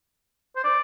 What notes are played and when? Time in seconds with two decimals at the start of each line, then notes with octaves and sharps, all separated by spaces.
0.56 C5
0.64 D5